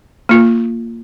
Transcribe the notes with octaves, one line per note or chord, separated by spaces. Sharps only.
A#3 F4